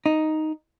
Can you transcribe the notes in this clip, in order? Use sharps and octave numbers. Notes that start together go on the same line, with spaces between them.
D#4